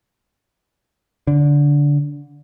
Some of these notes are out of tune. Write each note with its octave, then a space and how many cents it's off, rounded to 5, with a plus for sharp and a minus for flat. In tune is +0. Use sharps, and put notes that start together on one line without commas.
D3 -20